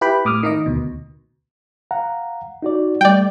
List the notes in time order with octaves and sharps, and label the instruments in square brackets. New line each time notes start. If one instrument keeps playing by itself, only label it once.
[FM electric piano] E4 G4 B4 G5 B5
A2 D6 D#6 F6
D#3 D#4 D#5
D2 B2
[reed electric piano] F5 F#5 A#5
D#4 F#4 D5
[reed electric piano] G3 A3 [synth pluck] D5 G5